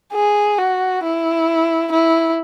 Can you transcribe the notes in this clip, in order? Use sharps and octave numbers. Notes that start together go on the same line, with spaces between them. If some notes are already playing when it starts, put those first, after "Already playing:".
G#4
F#4
E4
E4